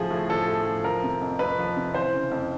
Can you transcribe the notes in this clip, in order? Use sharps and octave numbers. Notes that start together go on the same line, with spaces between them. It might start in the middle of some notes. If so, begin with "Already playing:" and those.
Already playing: A2 C#3 F3 G#4
A2
F3 A4
A2
F3
F3 A#4
C3
F2
F2 B4
F3
C3
E3 C5
C#3
F2